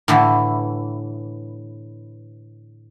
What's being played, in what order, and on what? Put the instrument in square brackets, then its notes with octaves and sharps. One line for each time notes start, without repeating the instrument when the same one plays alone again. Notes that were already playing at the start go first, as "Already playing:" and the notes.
[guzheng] A2 D3 E3